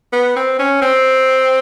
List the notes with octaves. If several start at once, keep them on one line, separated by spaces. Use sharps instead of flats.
B3
C4
C#4
C4